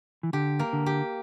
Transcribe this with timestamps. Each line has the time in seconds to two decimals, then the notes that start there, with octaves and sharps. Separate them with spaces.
0.23 E3
0.33 D3 G4
0.59 A#3
0.73 D3
0.86 G4